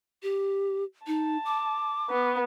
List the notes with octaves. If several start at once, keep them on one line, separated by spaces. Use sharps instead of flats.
G4
D#4 A5
D6
B3